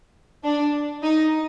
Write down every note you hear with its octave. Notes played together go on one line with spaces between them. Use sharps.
D4
D#4